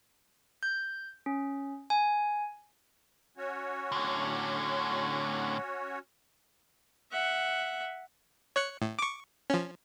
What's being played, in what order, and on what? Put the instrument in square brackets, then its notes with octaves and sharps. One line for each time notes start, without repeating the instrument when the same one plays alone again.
[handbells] G6
C#4
G#5
[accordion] C#4 F#4 C#5
[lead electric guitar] A2 D3
[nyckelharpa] E5 F#5
[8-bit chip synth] C#5 F#6 C#7
A2
C#6 D6
F3 C#4